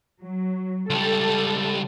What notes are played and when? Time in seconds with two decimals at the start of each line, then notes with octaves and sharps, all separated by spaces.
0.21 F#3
0.90 C#2 G3 A4